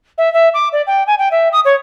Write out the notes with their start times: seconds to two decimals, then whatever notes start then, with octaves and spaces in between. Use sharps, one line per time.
0.18 E5
0.34 E5
0.54 D6
0.73 D5
0.87 G5
1.07 G#5
1.18 G5
1.31 E5
1.52 D#6
1.65 C#5